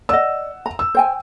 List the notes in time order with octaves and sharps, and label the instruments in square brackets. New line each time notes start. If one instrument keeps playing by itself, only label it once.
[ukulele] D5 D#5 [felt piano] F#5 E6
[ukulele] A#5
[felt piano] E6
[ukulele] C5 G5 G#5